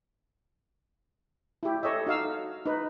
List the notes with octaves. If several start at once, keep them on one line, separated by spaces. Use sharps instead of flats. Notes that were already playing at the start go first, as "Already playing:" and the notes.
E4 G4
A4 C#5 D#5 E5
D#4 F#4 F5 E6
D#4 B4